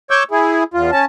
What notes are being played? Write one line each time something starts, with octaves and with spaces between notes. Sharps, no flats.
C#5 C#6 D6 E6 G6
E4 G#4
E2 F4
C#4 A5